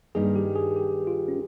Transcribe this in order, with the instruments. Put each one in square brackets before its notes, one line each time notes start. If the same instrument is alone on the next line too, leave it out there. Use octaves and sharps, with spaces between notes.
[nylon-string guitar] G2 D#3 A#3 D#4 [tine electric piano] G#4
[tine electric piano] G4
G#4
G4
F4
C#4